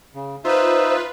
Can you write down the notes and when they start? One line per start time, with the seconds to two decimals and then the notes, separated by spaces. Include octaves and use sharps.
0.15 C#3
0.45 D#4 F4 B4 C5 E5